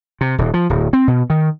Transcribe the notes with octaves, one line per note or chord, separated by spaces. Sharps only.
C3
D#1
F3
D1
C4
B2
D#3